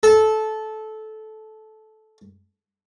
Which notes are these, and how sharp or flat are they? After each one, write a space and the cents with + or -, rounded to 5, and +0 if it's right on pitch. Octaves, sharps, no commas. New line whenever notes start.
A4 -15